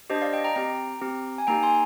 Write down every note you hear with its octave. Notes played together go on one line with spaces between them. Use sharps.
D4 G4 C5 D#5
D5 F5
D#5 G5
G5 A#5
C4 G4 G5 A#5
C4 G4
G#5
A#3 D#4 G4 G5 A#5
G#5 C6